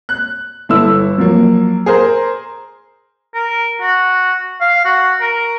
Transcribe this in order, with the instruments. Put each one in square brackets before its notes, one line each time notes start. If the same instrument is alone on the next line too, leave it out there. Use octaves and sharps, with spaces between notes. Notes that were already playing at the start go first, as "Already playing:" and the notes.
[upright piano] F#6
G1 E4 A4 E6
F3 F#3 A#3
G#4 A#4 C5
[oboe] A#4
F#4
F5
F#4
A#4